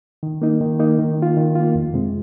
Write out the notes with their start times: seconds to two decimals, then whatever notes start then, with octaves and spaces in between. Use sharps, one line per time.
0.23 D#3
0.42 A#3 D#4
0.61 D#3
0.79 A#3 D#4
0.99 D#3
1.18 A#3 F4
1.37 D#3
1.55 A#3 F4
1.75 F2
1.94 C3 G#3 C4